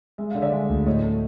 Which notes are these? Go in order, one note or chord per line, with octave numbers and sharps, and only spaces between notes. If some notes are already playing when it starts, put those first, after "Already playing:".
G#3 E5
D3 F5
D5 E5
G#3
D2
A2 C#5 D#5
A3